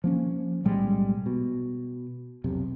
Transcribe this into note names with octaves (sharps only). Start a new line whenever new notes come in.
F3 A#3 C#4
B1 A2 G3 G#3
B2
F1 B1 C3